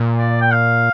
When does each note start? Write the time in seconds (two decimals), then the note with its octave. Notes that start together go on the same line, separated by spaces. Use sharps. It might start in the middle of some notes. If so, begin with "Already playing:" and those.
Already playing: A#2
0.18 D5
0.41 G5
0.52 F5